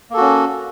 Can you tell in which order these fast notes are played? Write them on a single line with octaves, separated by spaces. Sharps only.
A#3 A4 F#4 C#4